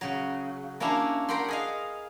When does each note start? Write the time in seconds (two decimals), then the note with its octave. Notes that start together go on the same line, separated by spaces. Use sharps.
0.01 C#3 F#3
0.80 A#3 C#4 D4 E4 F5
1.28 A#4 F#5 G5 B5 C6
1.48 G#4 D#5 F5